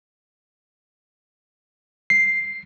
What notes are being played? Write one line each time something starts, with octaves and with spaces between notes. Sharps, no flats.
C7